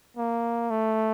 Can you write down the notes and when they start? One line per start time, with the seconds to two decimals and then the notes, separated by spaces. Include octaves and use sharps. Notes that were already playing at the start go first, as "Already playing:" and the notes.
0.17 A#3
0.70 A3